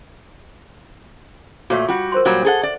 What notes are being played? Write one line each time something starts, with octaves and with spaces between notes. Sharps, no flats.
A#2 A3 F#4 C#5 F5
G3 F4 F#4
A#4 C5 C6
A#2 F#3 G3
G#4 A4 F#5
D5